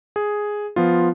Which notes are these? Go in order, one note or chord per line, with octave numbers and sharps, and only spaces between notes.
G#4
F3 B3 F4